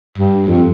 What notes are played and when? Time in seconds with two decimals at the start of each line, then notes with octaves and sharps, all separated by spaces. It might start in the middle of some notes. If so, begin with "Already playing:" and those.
0.18 G2
0.48 F2